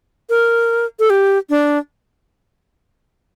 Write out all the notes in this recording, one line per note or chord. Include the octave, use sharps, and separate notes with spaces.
A#4
A4
G4
D4